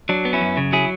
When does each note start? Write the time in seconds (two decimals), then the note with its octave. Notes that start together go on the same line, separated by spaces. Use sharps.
0.09 F#3 D4
0.25 B3
0.33 C#4 E4
0.41 F#2
0.57 C#3
0.73 F#3 E4 G#4